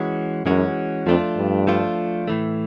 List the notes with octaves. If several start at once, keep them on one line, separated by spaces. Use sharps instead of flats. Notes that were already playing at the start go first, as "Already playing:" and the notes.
Already playing: E3 G#3 C#4 F#4
F#2 E3 G#3 C#4 F#4
F2 F3 A3 D4 F4
G2
F3 A3 D4 F4
A2 E3 A3